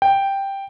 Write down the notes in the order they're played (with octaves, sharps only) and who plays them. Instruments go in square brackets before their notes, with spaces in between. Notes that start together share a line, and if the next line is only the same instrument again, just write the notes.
[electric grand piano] G5